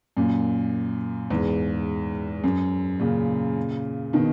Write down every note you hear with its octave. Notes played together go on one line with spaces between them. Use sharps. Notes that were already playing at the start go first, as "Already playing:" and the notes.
F#2 A#2
E2 G#2
F#2
A#2 C#3
B2 D#3